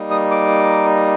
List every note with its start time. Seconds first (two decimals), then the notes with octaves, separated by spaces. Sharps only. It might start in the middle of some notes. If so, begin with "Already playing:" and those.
Already playing: G3 A#3 D#4
0.11 D#6
0.31 D6